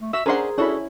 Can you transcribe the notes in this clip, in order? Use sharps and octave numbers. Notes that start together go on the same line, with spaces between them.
A3
F#4 E5 E6
C#4 D4 G#4 A#4 C5 F#5 C6
C#4 D4 E4 F#4 A4 B5